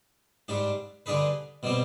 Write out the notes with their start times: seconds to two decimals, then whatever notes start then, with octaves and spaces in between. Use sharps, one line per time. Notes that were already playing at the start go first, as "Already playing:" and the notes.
0.48 G#2 G3 D4 G4
1.06 D3 G3 D4 G#4 B4
1.63 B2 G3 C4 G4